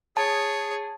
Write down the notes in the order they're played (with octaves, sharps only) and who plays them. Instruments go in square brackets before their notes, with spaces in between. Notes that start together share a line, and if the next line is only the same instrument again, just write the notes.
[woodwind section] G#4 [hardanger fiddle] C#5 [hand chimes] A5